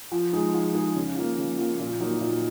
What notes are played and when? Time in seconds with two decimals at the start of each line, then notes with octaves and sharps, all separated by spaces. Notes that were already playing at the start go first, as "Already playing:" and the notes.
0.12 F3
0.33 G#3 D#4 G#4
0.54 F3
0.74 G#3 D#4 G#4
0.96 C#3
1.16 F3 A#3
1.38 C#3
1.58 F3 A#3
1.79 A#2
2.00 F#3 A#3 D#4
2.21 A#2